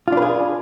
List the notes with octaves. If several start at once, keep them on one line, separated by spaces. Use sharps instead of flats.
D4 F4 G#4 B4